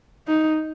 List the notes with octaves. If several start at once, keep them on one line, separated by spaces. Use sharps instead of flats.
D#4